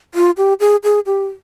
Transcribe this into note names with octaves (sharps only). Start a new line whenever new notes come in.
F4
G4
G#4
G#4
G4